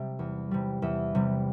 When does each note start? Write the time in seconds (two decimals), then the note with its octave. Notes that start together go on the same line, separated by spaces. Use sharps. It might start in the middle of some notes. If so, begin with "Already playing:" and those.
Already playing: C3 G3 E5
0.19 E2
0.51 C3 G3
0.82 E2 E5
1.15 C3 G3